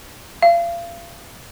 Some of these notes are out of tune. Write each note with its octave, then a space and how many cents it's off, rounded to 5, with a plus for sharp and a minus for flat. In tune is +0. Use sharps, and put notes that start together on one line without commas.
F5 -35